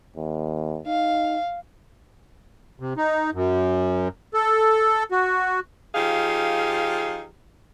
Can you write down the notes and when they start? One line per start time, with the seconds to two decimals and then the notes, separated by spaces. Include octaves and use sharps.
0.16 D#2
0.87 D#4 F5
2.80 C3
2.97 D#4
3.33 F#2
4.34 A4
5.11 F#4
5.94 F3 D#4 G4 G#4 F5